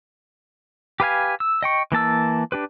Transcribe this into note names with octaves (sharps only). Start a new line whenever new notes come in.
G4 B4 F5 G#5
E6
D#5 G5 C#6
E3 A#3 A5 E6
D4 G4 B4